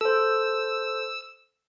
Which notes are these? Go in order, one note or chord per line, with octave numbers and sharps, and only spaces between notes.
A4 C5 E6